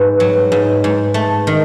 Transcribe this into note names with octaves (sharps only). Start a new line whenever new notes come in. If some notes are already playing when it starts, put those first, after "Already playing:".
Already playing: G#2 B4
F#3
G#2
G#2
A3
D#3